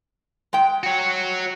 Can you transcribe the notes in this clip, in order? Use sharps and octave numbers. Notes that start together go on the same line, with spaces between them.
G#3 G5
F#4 C#5